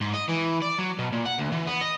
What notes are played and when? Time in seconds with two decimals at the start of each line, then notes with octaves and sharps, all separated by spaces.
0.01 G#2
0.14 D#5
0.29 E3
0.62 D5
0.78 F#3
0.99 B2
1.12 A#2
1.25 F#5
1.38 D2
1.52 E3
1.67 B3
1.81 D#5